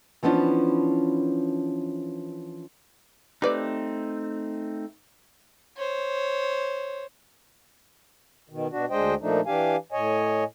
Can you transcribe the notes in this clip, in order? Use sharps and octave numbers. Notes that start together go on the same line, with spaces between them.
E3 F3 B3 C#4 D4
A3 C4 D#4 G4 B4 D5
C5 C#5
B2 D#3
B2 D4 F#4
D2 G#3 D4 C5 D#5 G5
A#2 F3 A3 D4 D#4
E3 D4 G4 F5 G#5
A2 C#5 D#5 G#5